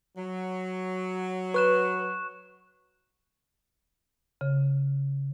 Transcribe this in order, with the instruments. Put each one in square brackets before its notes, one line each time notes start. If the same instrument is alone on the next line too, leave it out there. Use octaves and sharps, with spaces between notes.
[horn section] F#3
[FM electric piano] B4 [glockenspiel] C#6 F#6 E7
[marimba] C#3